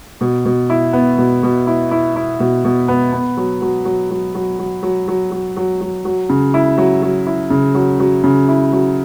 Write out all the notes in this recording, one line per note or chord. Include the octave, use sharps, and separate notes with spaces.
B2
B2
E4
B3
B2
B2
E4
E4
E4
B2
B2
B3
B3
F#3
F#3
F#3
F#3
F#3
F#3
F#3
F#3
F#3
F#3
F#3
F#3
C#3
E4
F#3
F#3
E4
C#3
F#3
F#3
C#3
E4
F#3